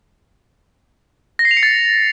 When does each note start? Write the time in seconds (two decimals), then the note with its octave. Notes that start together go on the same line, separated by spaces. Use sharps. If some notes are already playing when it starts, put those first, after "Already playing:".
1.39 A#6
1.45 C7
1.51 F7
1.57 C#7
1.63 A6